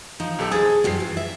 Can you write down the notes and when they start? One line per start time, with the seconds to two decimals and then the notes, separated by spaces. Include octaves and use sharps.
0.20 F3 D#4
0.39 B1 G4 A4
0.51 G#4 A4 C5 D#6 G#6 A6
0.84 F#2 F3 G3 A4 C7
1.00 E3
1.17 E5